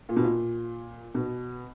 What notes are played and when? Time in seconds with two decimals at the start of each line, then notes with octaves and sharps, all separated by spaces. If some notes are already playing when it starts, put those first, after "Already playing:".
0.09 A#2
0.16 B2
0.24 A#2
1.14 B2